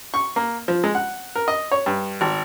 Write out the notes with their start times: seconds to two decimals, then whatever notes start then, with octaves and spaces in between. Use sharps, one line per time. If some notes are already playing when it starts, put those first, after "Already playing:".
0.14 C#6
0.36 A#3
0.68 F3
0.84 G#3
0.95 F#5
1.35 A#4
1.48 D#5
1.71 C#5
1.86 G2
2.21 G#1